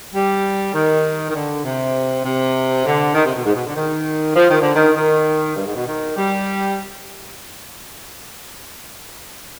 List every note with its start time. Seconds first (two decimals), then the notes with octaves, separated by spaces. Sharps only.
0.14 G3
0.74 D#3
1.29 D#3
1.34 D3
1.64 C3
2.24 C3
2.85 D3
3.14 D#3
3.24 C3
3.34 B2
3.45 G#2
3.54 B2
3.65 D3
3.75 D#3
4.36 F3
4.49 D#3
4.61 D3
4.75 D#3
4.95 D#3
5.55 G2
5.66 G#2
5.75 B2
5.86 D#3
6.16 G3